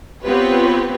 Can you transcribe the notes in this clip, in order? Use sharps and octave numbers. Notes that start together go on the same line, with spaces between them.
B3 C4 F4 G4 B4 C#5